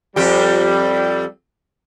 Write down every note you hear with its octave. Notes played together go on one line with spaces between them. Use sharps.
F2 G3 G4